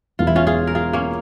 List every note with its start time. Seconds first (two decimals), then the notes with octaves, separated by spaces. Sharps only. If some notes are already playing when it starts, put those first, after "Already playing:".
0.19 E1 E2 E3 F4
0.27 E4
0.36 C#4 F4
0.47 F4 G#4
0.67 A#4
0.75 F4 G#4
0.93 A#3 C#4